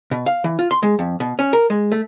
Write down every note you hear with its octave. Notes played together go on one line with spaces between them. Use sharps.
B2
F5
E3
F4
C6
G#3
F2
B2
C#4
A#4
G#3
A3